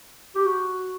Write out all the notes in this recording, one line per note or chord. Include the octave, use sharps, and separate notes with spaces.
G4
F#4